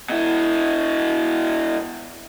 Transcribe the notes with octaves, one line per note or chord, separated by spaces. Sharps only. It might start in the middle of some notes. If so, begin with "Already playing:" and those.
B2 E4